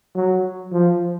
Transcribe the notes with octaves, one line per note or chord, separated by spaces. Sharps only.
F#3
F3